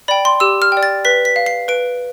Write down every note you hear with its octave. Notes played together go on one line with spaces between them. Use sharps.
D5 G5 B5
C6
G4 E6
F6
D5 G5
A6
B4 B6
B6
F5
C7
B4 D7